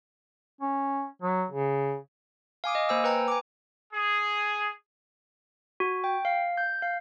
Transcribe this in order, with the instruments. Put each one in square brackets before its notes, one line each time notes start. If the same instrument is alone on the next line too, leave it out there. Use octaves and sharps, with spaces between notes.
[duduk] C#4
F#3
C#3
[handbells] F5 G#5 D6 D#6
D#5
A#3 C5 G#5 E6
B4 G5 A#5
G#5 D6
[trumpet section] G#4
[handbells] F#4
G5
F5
G6
F5